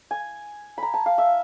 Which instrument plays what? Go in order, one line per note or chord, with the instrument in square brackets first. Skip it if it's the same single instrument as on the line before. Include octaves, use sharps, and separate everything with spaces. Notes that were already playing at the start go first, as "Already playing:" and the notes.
[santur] G#5
A#5 B5
A5
F5
E5